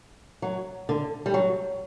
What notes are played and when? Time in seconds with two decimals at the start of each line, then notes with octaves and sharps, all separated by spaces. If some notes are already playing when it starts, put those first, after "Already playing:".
0.42 F#3
0.89 D3
1.26 G3
1.34 F#3